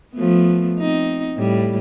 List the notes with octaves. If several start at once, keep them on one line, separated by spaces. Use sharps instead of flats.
F3 A3 B3
C4 D#4
A2 G3